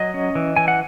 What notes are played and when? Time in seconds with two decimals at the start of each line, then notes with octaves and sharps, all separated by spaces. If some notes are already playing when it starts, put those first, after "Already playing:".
Already playing: F#3 D#5
0.14 C#4
0.35 E3
0.56 E3 G#5
0.68 F#5